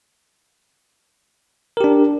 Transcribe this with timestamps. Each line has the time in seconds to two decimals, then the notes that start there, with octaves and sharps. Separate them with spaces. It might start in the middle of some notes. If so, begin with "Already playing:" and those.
1.77 A#4
1.81 G4
1.84 D4